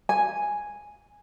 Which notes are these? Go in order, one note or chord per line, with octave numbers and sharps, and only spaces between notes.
G#5